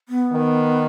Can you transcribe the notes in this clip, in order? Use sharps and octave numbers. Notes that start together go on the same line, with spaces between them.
B3
D#3